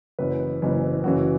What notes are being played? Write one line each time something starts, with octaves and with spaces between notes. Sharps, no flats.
F#1 F#2 E3 B4
F#1 F#2 E3
F#1 F#2 C#3 E3 F#4